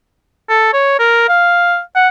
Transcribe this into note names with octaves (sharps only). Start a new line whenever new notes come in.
A4
C#5
A#4
F5
F#5